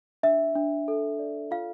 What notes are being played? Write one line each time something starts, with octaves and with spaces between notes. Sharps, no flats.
D4 E5
D4
A4
D5
F4 F5